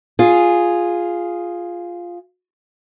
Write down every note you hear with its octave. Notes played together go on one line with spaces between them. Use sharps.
F4 G#4